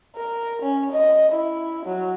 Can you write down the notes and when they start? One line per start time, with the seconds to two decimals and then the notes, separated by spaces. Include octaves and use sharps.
0.16 A#4
0.62 C#4
0.92 D#5
1.32 E4
1.86 F#3